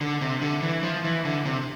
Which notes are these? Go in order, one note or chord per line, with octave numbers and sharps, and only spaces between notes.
D3
C3
D3
E3
F3
E3
D3
C3